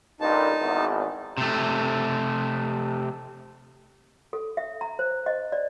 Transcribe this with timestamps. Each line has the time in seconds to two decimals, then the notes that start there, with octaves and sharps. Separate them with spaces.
0.20 A1 G2 A#2 D#4 A5
0.60 G#1 E2
1.37 C3 A3
4.33 A4
4.57 E5
4.81 A#5
4.99 C5
5.26 D#5
5.52 D5